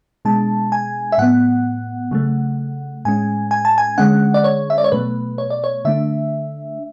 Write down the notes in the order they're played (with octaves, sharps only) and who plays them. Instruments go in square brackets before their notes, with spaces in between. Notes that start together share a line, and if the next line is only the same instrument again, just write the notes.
[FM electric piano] B2 G#3 D4 A5
G#5
E5
A2 F#3 B3 F#5
C#3 F#3 A3
A2 G#3 C#4 G#5
G#5
A5
G#5
D3 G#3 C#4 F#5
D5
C#5
E5
D5
C#5
B2 F#3 A3 B4
C#5
D5
C#5
D3 A3 D4 E5